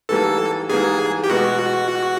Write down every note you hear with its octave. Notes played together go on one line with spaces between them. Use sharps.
G#2 E3 G3 A#3 A4
G#2 E3 G3 A#3 G#4
G4
B2 G#3 B3 F#4